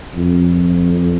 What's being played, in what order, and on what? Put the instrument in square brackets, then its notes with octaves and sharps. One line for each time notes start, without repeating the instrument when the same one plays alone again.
[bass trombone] F2